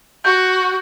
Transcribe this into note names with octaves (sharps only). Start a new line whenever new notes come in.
F#4 G6